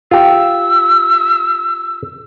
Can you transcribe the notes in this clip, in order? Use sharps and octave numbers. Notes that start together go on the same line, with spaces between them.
F4 G4 E6